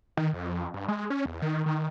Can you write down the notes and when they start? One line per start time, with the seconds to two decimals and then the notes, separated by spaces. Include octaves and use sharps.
0.17 D#3
0.34 F2
0.74 G2
0.88 G#3
1.10 C#4
1.26 E2
1.42 D#3
1.66 D#3